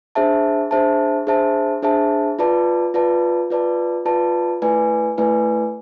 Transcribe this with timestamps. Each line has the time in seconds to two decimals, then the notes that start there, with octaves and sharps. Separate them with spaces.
0.15 D4 G#4 C5 E5 A5
0.71 D4 G#4 C5 E5 A5
1.27 D4 G#4 C5 E5 A5
1.82 D4 G#4 C5 E5 A5
2.39 F4 B4 D5 A5
2.94 F4 B4 D5 A5
3.50 F4 B4 D5 A5
4.06 F4 B4 D5 A5
4.62 A3 E4 B4 D5 G#5
5.18 A3 E4 B4 D5 G#5